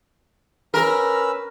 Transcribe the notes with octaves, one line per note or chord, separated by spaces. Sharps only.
C#4 A#4 B4 E6